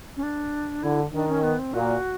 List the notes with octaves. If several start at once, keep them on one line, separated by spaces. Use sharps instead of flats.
C#4
D4
D3 E4
D#3 D4
C#4
B3
C4
A#2 F#4